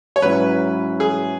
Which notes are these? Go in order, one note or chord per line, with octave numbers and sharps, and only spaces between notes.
C#5
G#2 F#3 C#4 E4 B4
G#4